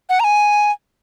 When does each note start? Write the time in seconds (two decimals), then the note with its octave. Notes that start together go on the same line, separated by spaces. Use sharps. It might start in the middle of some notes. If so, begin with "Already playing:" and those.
0.09 F#5
0.20 A#5
0.24 G#5